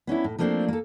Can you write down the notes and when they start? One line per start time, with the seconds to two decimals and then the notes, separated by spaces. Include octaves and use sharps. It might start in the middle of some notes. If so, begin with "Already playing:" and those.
0.07 B3 C#4 D4 E4
0.24 A2
0.38 F3 A3 A#3 C4 D4
0.68 A#3 A4